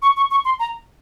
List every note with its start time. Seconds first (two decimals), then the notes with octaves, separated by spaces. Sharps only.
0.02 C#6
0.17 C#6
0.31 C#6
0.45 C6
0.59 A#5